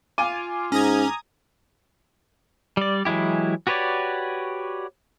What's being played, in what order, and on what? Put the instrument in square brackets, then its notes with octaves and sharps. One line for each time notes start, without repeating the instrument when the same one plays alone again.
[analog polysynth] F4 [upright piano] G#5 D6 D#7
[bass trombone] G#2 [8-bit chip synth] C#4 [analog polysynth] A#5 D#6 G#6
[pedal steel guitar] G3 D5
E3 F#3 G#3 E4 G4
F#4 G4 B4 C#5 D5